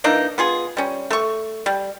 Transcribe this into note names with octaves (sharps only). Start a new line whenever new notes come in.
E3 A#3 D4 D#4
B3 F4 G#4
G3 C#4
A3 C#6
G3